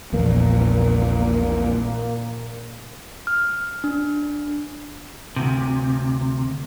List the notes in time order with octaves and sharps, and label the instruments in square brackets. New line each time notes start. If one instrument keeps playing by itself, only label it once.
[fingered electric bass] A#1 E2 [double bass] A#2 [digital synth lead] A#3
[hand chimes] F6
D4
[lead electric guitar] D2 C3